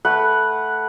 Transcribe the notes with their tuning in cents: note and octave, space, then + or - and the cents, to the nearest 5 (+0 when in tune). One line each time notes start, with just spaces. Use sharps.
A3 +0 B4 -10 F#5 +0